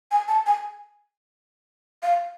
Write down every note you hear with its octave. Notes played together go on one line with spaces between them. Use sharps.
G#5
A5
G#5
F5